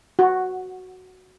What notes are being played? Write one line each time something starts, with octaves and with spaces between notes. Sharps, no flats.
F#4